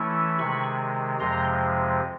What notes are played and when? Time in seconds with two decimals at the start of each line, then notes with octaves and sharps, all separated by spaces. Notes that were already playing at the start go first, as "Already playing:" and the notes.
Already playing: E3 A3 C#4 E4
0.39 C3 D#3 G#3 B5 C#6
1.20 F2 C3 F3 G#3 A#5 C6